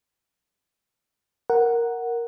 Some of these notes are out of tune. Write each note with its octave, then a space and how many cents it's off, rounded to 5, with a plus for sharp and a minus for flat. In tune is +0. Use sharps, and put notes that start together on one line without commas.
A#4 +0 F#5 +0